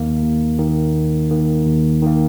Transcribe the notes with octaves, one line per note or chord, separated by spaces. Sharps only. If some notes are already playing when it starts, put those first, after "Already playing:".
Already playing: D#2 D#3 A#3
D#2
D#3 A#3
D#2
D#3 A#3
D#2
D#3 A#3